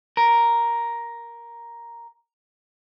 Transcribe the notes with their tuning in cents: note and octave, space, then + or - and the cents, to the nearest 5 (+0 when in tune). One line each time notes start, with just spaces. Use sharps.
A#4 +5